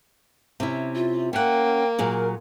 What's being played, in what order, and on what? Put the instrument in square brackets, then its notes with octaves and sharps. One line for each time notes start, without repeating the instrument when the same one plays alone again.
[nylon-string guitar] C3 C#4 E4
[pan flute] F4
[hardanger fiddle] A#3 [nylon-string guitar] C#4 F#5 [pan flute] G5
[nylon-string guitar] A#2 F#3 G#4 [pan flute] A#4